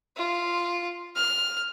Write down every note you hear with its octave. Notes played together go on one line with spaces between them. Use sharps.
F4
F6